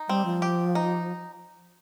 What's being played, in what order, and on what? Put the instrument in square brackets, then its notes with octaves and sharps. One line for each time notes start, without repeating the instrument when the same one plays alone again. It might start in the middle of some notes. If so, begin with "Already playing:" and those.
Already playing: [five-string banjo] D#4
[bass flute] G3 [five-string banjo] C4
[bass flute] F3
[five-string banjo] G4
D#4